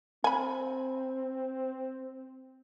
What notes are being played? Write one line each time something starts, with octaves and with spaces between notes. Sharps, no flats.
C4 G#5 B5